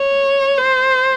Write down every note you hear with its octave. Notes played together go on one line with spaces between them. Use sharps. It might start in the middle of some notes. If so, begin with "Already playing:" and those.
Already playing: C#5
C5